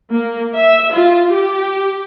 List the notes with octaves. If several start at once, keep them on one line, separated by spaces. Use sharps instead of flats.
A#3
E5
F4
G4